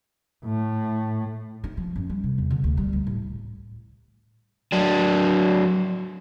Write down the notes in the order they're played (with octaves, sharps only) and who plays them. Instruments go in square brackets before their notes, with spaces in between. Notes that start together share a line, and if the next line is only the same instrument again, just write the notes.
[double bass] A2
[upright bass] D#4
F3
F#2
G3
C3
E2
D3
D2
G3
D2
A2
[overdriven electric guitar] F#3 D4